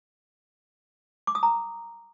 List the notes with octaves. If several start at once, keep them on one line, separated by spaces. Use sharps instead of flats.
D6
D#6
A#5